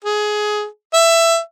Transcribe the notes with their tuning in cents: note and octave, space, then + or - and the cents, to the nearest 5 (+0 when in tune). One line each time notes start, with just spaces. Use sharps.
G#4 +15
E5 +15